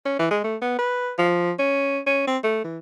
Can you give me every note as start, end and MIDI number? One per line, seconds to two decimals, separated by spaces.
0.06 0.19 61
0.19 0.30 52
0.31 0.40 56
0.44 0.57 57
0.62 0.78 59
0.79 1.12 71
1.19 1.52 53
1.59 1.99 61
2.07 2.24 61
2.28 2.38 60
2.44 2.63 57
2.64 2.78 52